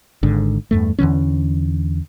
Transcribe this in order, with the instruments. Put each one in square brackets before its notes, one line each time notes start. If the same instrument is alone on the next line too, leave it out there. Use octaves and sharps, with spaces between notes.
[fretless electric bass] G#1 G#2 D3
E2 G2 A3
E2 D3 E3 C#4